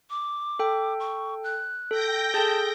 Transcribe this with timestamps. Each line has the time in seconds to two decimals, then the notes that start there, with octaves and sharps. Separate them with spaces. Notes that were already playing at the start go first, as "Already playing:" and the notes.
0.10 D6
0.59 A4 G5
1.00 C#6
1.44 F#6
1.91 A4 G5 G6 A#6
2.34 G#4 A4 A5